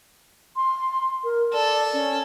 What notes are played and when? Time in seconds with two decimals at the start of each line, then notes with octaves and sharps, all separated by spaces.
0.56 C6
1.24 A#4
1.53 A4 D5
1.93 C#4